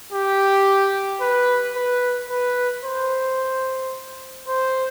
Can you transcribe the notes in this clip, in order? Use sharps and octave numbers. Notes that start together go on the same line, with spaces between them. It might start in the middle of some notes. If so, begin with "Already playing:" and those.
G4
B4
B4
B4
C5
C5